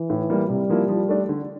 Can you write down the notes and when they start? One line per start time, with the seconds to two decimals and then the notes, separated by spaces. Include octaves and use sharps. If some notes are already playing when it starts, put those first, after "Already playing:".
Already playing: E3
0.10 A2
0.30 G3 A#3 E4
0.49 C3 G3
0.70 F3 A#3 E4
0.89 F3
1.09 A3 D4
1.29 D3